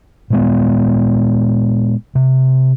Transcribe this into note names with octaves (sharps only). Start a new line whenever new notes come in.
A#2 G#3 B3
C3